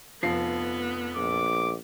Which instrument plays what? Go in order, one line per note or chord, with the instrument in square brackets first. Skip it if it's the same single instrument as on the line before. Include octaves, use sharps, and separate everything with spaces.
[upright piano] F1 F3 C7 [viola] B3
[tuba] A#1 [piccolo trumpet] D6